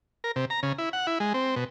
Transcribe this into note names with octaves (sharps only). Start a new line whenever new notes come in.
A#4
C3
A#5
C#3
E4
F#5
E4
G#3
C4
B2